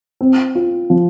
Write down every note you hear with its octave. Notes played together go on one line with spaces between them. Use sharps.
C4
F4
F3